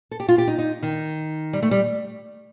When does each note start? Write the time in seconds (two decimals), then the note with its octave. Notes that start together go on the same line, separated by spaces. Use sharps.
0.11 A4
0.20 G4
0.28 F4
0.38 G4
0.47 D#4
0.58 D#4
0.83 D#3
1.53 G3
1.62 A3
1.71 G3